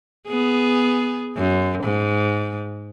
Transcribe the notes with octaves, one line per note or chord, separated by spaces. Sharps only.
B3 G#4
F#2
G#2